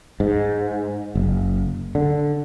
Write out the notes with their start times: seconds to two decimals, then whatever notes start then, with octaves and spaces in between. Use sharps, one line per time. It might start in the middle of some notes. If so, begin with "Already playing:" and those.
0.20 G#2
1.15 F#1
1.95 D3